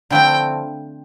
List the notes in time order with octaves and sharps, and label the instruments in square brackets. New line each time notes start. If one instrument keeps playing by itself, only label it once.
[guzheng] D3 F3 A3 C4 E4 [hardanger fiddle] G5